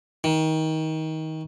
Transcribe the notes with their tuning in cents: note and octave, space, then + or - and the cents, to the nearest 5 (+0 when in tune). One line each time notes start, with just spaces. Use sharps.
D#3 +25